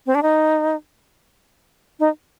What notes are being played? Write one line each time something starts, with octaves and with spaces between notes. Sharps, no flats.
C4
D4
D#4
D#4